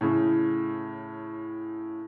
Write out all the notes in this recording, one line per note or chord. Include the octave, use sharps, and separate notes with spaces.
A2 C#3